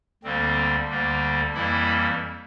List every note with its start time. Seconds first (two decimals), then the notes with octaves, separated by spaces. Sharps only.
0.23 D2 D3 G3 A#3 C4
0.89 D2 D3 G3 A#3
1.54 F2 E3 G3 A#3 E4